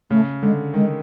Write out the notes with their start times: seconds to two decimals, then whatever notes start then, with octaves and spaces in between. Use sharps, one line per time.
0.10 C#3 A3
0.42 D3 G#3
0.74 D#3 G#3